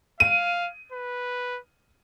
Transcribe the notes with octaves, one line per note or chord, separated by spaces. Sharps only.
F5 D#7
B4